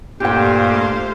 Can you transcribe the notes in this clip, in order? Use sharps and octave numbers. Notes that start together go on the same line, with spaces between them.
G2 A#2 A3 G4 C5 F5 G5